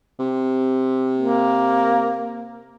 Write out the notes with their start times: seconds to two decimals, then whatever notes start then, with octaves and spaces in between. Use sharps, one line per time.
0.19 C3
1.17 A#3